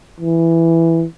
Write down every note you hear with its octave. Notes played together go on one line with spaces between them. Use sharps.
E3